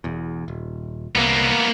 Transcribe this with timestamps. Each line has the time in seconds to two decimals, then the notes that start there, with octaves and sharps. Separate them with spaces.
0.04 E1 E2
0.48 D#1
1.15 C2 A#3 B3